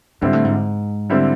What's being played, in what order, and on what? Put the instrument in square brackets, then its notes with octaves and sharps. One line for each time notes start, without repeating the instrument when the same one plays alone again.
[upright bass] G#2 [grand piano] D3 G3 C4 E4
[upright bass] A2
G#2
[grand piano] D3 G3 C4 E4